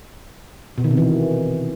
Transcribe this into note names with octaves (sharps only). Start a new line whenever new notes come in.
B2
D#3
C3
E3